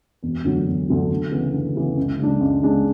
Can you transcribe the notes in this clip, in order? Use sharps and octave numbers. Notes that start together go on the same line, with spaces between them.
E1
D2 D3 F#3
E1
D2 D3 F#3
D2
C#3 E3 B3
D2
C#3 E3 B3
C#2
C#3 G#3 D4
C#2
C#3 G#3 D4